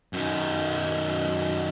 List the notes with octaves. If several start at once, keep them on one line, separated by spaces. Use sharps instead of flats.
F#2 D#3